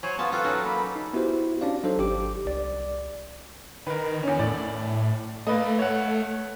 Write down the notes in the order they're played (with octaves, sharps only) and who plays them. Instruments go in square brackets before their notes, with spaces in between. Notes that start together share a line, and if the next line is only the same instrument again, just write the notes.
[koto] F#3 [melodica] C5 C#5 G#5
[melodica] B3 F4 [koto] C#4 A5
[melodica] C4 F#5 [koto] F4 A4 [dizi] B4
[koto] F#3 D#4 [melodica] C#4
[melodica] A#3 [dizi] B5
[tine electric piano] D#4
B3 E4 F#4 G4 C5
C#4 D4 D5 F5
F#3 D4 D#4 A4 C5
G#1 G4 D6
C2 D5
[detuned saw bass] D#3 [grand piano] A#4 B4
[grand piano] E2 C#4
[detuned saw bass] A2 [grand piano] D5
[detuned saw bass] A3 [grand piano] A#3 B4 D#5
[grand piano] C#5 F#5